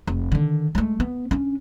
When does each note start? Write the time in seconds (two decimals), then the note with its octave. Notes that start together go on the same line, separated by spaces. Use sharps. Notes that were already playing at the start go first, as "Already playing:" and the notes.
0.07 F1
0.32 D3 D#3
0.75 G#3 A3
1.00 B3
1.31 C#4 D4